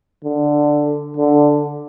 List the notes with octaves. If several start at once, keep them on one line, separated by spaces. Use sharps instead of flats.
D3
D3